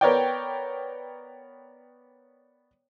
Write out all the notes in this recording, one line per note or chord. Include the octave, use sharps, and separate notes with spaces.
B3 A#4 C#5 D5 G5